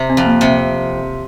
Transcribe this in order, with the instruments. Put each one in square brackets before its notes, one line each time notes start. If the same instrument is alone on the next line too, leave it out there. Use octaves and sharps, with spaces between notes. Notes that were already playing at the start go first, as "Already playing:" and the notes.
Already playing: [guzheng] C3
[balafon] C4
[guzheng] F2
[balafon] A#3
[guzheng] C3 [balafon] C4